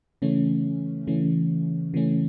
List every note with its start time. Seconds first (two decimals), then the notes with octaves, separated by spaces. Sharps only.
0.22 C#3 E3 A3 C#4
1.07 C#3 E3 A3 C#4
1.94 C#3 E3 A3 C#4